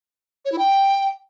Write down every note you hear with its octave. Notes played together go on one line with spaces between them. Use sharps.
C#5
E4
G5